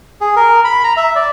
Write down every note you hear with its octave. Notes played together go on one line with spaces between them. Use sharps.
G#4
A#4
B5
A#5
E5
D5